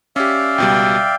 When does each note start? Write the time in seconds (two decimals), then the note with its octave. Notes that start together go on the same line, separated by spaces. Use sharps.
0.16 C#4 G4 D5 E5 F5
0.58 C#2 B2 G3 G5